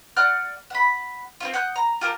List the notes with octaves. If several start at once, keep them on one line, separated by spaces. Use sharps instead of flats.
D5 F#5 F6 F#6
F#5 B5
C4 E4 F4
F#5 D#6 F#6 G6
A#5
F4 G4 A#4 A5